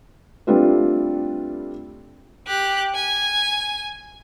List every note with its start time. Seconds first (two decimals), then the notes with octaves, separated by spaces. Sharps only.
0.47 G3 A3 C4 D4 F4 B4
2.47 G4 F#6
2.95 G#5